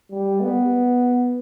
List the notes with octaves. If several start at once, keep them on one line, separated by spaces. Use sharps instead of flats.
G3
B3